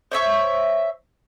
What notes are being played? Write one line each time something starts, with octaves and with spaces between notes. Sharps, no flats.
C5 C#5 E5 C#6